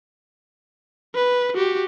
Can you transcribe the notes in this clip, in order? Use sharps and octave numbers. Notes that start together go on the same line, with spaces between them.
B4
F#4 G4